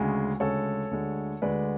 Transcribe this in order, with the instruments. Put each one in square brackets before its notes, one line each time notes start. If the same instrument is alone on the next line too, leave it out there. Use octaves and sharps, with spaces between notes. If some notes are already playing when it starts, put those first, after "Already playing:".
Already playing: [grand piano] D2 C#3 G#3
D2 C#3 G#3 A4 C#5
D2 D3 G#3
D2 D3 G#3 B4 D5